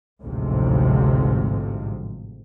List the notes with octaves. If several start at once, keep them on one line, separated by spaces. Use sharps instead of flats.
A1 D2 G#2 C3 F3